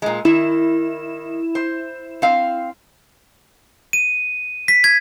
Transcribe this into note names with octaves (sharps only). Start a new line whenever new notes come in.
A#2 G#3
D#3 E4 E7
C5
C4 F5
D#7
B6
G#6